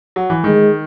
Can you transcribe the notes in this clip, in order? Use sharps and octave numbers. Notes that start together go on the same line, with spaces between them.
F#3
E3
D#3 G#3